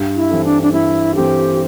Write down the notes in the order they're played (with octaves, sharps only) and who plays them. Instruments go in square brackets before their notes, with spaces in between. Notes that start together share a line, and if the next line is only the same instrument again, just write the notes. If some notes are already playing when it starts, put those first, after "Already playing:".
Already playing: [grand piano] G2
[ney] E4
[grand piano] E3 C4 A4
[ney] D4
D4
[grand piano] G2 [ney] E4
[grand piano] E3 C4 A4 [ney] G4